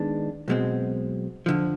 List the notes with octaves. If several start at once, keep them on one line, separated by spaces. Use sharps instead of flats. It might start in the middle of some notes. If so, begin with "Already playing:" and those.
Already playing: D#3 G#3 B3 D4
B1 B2 G#3 C4
F2 D3 F3